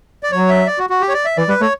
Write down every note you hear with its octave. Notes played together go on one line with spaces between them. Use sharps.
D5
F#3 C#5
E5
D5
F#4
F#4
G4
C#5
D5
E5
E3 D5
G3 B4
A3 C#5